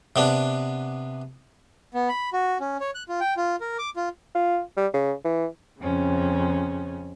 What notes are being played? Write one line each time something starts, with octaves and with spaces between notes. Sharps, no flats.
C3 B3 D4
B3
B5
F#4
C#4
C#5
F#6
F4
G5
F4
A#4
D6
F4
F4
G3
C#3
E3
F2 C#3 C#4